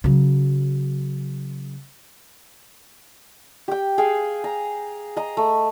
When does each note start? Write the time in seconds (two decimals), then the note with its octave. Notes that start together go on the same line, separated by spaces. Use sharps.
0.04 C#3 F#3
3.68 G4 G5
3.98 G#4 F5 G5 G#5
4.44 A#5
5.16 D#5 A#5
5.37 A3